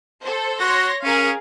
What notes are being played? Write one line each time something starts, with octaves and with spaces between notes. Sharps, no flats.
A4 C5
F#4 C#5 C6 A#6
C#4 G#4 A#4 F5